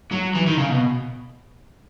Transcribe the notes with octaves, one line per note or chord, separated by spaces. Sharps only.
F#3
E3
D#3
C#3
B2